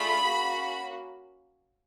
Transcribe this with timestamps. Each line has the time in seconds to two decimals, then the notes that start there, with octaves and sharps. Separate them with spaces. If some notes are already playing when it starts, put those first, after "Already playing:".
Already playing: A3 D4 F4 G#4 B5
0.26 A#3 C#4 F#4